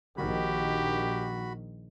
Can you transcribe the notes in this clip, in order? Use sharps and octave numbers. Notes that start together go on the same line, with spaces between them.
A#1 D#3 F#4 G4 B5